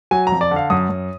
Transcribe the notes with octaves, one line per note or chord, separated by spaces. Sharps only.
F#3 G#5
A#5
F2
D5
D3
F5
F#2 D#6
F#2